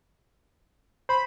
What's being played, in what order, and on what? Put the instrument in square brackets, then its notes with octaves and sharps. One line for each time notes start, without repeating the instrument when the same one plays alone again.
[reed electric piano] C5 [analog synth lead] B5